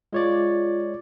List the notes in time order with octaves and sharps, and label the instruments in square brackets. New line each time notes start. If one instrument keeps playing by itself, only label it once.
[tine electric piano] G#3 C#5 D5 [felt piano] F4